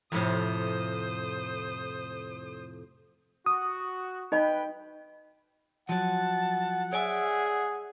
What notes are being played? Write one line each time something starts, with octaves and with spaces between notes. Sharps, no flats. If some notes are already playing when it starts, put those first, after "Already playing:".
F2 A2 C3 C5 D#6
F#4 D#6
D#4 B4 D#5 G5 B5
F3 F#3 F#5 A5
G#4 C#5 D5 E5 G#5